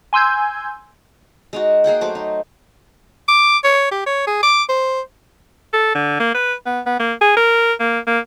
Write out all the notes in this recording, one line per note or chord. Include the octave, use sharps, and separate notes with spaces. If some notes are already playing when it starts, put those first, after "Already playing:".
G#5 C6 E6 G6 G#6
G#3 D#4 F#4
A#3 G#4 F#5 G5
F#3 A3 C5 D6
D#4
D6
C#5
G4
C#5
G#4
D6
C5
A4
D3
A#3
B4
B3
B3
A#3
G#4
A#4
A#3
A#3